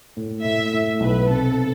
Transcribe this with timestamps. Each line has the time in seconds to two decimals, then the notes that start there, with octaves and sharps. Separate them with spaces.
0.17 A2
0.44 A2 E5
0.73 A2
1.00 B1 B4
1.28 C3 A4